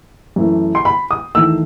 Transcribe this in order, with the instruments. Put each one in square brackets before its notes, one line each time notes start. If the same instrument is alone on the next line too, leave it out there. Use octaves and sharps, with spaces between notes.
[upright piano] F#2 E3 A3
C6
B5
D#6
E2 D#3 A3 E6